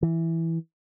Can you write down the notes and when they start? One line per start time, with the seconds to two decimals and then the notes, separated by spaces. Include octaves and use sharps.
0.03 E3